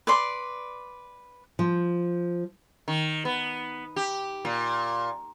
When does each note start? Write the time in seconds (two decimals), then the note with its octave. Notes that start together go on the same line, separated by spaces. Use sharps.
0.07 B4 D5 C6
1.59 F3
2.88 D#3
3.25 B3
3.96 G4
4.45 A#2